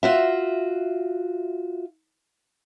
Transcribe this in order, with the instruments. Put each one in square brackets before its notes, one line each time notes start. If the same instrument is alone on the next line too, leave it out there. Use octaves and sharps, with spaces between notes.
[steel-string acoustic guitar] F4 F#4 E5